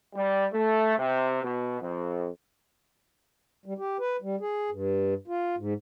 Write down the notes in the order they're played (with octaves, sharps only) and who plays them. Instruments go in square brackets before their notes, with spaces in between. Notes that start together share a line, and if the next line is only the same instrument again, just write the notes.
[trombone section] G3
A3
C3
B2
F2
[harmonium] G3
G4
B4
G3
G#4
G2
F4
G#2